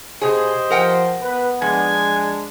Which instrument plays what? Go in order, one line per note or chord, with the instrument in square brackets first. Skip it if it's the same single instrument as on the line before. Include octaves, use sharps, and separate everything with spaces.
[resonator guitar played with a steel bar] B2 G#4 [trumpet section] G4 C5 D#5
[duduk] F3 [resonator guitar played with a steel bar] A#4 F#5 G5
[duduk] B3 [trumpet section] B4
[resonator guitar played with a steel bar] F3 [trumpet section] G#3 D4 [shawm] G#5